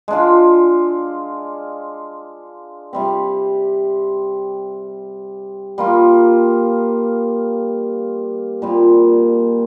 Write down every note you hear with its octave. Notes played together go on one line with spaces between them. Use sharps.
G#3 D4 F4
C3 G3 C4
G3 A#3 F4
A#2 G3 C4